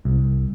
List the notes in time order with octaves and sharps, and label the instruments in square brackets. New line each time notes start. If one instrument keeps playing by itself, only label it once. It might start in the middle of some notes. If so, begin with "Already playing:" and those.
[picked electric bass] C2